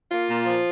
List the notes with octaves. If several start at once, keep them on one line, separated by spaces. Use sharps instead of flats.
A#3 F4
A#2
F3